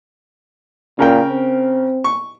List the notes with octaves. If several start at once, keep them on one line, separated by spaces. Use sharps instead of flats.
A#2 C#3 A#4 G5
C4
C#6